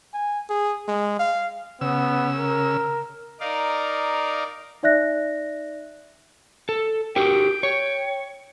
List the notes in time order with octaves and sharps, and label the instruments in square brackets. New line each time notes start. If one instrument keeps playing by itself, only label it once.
[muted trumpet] G#5
G#4
G#3
F5
[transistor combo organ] C#3 E6 [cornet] B3
[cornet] A#4
[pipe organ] D#4 A#4 D5 F5
[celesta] D#4 D5 E5 F#6 A#6
[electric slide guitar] A4
[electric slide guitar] F#4 G4 A#4 [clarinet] G5
[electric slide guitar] C#5